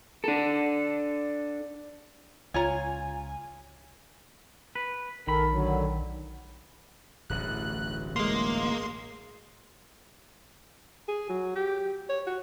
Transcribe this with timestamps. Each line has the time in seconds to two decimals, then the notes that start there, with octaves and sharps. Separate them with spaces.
0.24 D4 A4
2.54 C#2 F4 C#5 G#5 A#5
4.75 B4
5.27 A#1 D#3 A4 A#4 B5
5.51 D3 F#3
7.30 D1 A1 G2 F#6
8.16 G#3 A#3 C6
11.08 G#4
11.29 F#3
11.55 G4
12.09 C#5
12.27 F#4